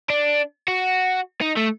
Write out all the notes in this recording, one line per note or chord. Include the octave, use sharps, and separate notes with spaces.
D4
F#4
D#4
A3